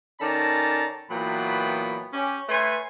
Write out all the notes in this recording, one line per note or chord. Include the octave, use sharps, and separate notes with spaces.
D#3 C#4 A4 D5 A5 A#5
A#2 E3 F#3 B3 G5 B5
C#4 G4
A3 B4 C#5 G#5 C6